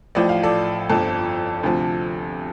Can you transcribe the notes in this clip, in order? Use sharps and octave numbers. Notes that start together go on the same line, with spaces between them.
A1 A2 F3 D5
F5
A4 D5
G1 F2 F3 A4
D2 C3 F3